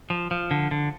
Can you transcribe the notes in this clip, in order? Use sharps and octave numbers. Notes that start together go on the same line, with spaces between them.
F3
F3
D3
D3